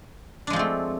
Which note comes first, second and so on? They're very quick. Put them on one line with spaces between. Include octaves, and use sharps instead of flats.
D4 G#3 F3 C4 A3